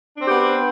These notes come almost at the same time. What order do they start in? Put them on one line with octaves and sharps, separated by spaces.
D4 C4 G4 B3